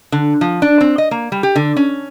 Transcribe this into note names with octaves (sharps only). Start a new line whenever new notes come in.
D3
F3
D4
C4
D#5
A#3
G3
G4
D3
C#4